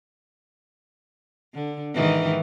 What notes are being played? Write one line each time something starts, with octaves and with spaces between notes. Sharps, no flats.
D3
G#2 D#3 E3